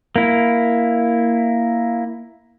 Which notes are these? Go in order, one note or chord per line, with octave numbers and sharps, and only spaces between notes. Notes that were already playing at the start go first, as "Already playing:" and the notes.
A#3 E4